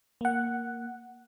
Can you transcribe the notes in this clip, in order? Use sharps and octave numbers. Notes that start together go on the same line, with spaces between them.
A#3 F#5